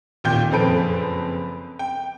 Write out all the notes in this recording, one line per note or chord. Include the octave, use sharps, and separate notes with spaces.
D#2 A#2 G5 G6
F#1 F2 C4 A4 B4 D7
G5